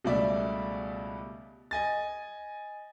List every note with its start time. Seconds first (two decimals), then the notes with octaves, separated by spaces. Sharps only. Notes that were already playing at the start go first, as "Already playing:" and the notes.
0.04 C#2 B2 G3 A3 D5 E5
1.71 D#5 G#5 A6